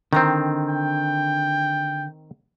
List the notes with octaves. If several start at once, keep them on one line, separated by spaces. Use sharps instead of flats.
D3 D#3 C4 A#5
G5